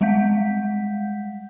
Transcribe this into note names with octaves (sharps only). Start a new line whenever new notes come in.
G3 G#3 F5 F#5 G6 B6